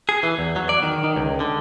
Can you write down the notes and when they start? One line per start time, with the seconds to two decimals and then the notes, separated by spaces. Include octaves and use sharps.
0.09 G#4
0.23 E3
0.39 E2
0.56 F#3
0.69 D5
0.83 D#3
1.04 D#3
1.16 C#2
1.40 D3